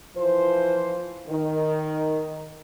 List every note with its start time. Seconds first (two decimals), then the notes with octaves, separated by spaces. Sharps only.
0.16 E3 F3 C5
1.28 D#3